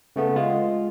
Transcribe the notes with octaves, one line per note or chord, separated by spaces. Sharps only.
C#3 A3 B3
G#3 F4